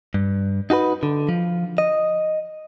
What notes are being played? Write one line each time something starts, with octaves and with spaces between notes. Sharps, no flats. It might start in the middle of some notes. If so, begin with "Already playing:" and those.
G2
D#4 F#4 G#4 B4
D3
F3
D#5